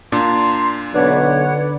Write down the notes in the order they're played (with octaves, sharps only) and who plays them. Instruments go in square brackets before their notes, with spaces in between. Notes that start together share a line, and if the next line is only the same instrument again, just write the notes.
[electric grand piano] A#2 D4 [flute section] A#5 C6
[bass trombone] B1 [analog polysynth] D3 B4 D5 [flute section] C#5 F#5 F#6